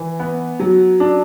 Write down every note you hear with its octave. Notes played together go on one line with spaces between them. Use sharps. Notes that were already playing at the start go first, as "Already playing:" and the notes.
Already playing: E3
B3
F#3
D4